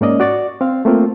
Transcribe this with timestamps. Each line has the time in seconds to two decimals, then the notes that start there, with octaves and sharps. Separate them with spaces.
0.01 G#2 A#3 C#4 D5 D#5
0.20 F#4 D5 C#6 A6
0.61 C4 F5
0.85 A3 A#3 C4 F4